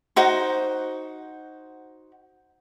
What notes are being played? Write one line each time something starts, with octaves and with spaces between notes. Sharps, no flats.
D#4 F#4 C5